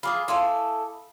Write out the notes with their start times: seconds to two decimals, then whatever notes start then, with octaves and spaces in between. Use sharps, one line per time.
0.03 F4 G#4 E5 B5 D6 D#6
0.28 E4 A4 F5 G#5 C6 E6